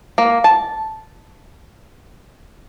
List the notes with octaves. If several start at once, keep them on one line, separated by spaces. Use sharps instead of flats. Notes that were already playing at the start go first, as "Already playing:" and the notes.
A#3
A5